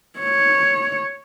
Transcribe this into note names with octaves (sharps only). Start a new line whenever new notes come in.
C#5